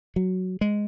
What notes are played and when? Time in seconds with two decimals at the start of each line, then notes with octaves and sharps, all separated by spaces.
0.16 F#3
0.61 G#3